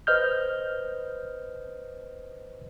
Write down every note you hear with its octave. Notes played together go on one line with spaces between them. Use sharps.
B4 C5 D#5 F6 G6